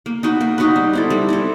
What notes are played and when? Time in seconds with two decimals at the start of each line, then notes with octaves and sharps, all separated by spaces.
0.06 A#3
0.23 D#4 F#4 B4
0.41 A#3
0.58 D#4 F#4 B4
0.76 G3
0.93 C4 E4 A4
1.10 G3
1.29 C4 E4 A4